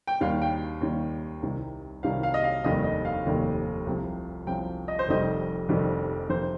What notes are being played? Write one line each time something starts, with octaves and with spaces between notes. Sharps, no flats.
G5
D#2 D#3 G3 F5
G5
D#2 D#3 G3
C2 C3 D#3 G3
C2 C3 D#3 G3 F5
F5
D#5
F5
F1 D#2 D#3 G3 D#5
D#5
F5
F1 D#2 D#3 G3
C2 C3 F3
C2 C3 F3 G5
D#5
C5
F1 F2 D#3 G3 D#5
F1 F2 D#3 G3
F2 C3 D#3 C5